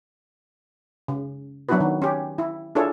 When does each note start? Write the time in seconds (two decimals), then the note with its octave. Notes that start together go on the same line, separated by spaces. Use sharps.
1.08 C#3
1.69 F#3 B3 D4 E4 F#4 B4
1.80 D#3
2.02 C#4 G4
2.38 E4
2.75 D4 E4 F4 G#4 A4 C#5